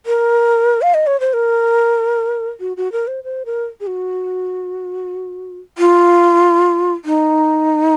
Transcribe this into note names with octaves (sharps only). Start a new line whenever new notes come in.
A#4
F5
D#5
C#5
C5
A#4
F#4
F#4
A#4
C5
C5
A#4
G#4
F#4
F4
D#4